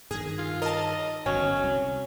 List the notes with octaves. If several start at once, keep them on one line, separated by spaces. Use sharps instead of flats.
G2 D#3 G#4
F4
A#4 D#5 A5
G1 G2 F#3 C#4
C2